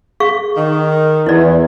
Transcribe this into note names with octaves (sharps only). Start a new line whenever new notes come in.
G#4 F5 C#6
D#3
E2 E3 E4 D5